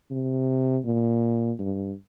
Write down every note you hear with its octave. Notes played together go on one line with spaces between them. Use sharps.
C3
A#2
G2